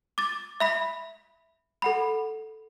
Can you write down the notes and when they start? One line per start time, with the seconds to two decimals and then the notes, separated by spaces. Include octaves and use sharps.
0.18 D6 A6
0.60 E5 B5 B6
1.82 A4 F#5 B5